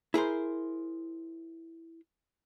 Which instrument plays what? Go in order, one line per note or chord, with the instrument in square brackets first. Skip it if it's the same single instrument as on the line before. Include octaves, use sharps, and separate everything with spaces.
[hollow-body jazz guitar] E4 G#4 A#4 C5